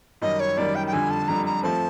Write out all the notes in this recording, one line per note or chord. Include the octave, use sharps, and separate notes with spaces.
F#2 D#3 G3 D#5
C#5
F#2 D#3 G3 D5
G5
G5
F2 D3 G3 G#5
A5
F2 D3 G3 A#5
A#5
F3 A3 C4 A5